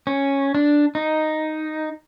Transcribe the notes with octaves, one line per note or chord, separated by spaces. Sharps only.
C#4
D4
D#4